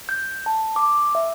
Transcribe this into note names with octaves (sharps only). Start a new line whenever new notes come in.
G6
A5
D6
E5